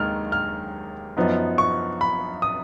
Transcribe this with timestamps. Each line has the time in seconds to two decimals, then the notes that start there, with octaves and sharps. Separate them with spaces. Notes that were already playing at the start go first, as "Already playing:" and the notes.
Already playing: D#2 D#3 G#3 F6
0.32 F6
1.17 F#2 F3 B3 D#4
1.58 C#6
2.01 B5
2.42 D#6